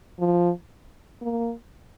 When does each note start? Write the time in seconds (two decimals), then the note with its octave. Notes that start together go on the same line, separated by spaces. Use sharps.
0.19 F3
1.22 A#3